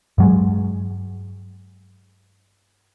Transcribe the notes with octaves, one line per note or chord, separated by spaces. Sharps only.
G2 F#3 G#3